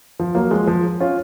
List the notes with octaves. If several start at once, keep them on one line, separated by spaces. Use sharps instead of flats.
F3
F#3 A#3
F3 G#3
F3
C#4 F4